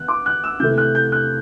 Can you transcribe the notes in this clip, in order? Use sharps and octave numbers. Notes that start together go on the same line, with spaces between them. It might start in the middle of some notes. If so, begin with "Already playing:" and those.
Already playing: E3 B3 F#6
D6
F#6
E6
C3 E3 A3 E4 G6
F#6
G6
F#6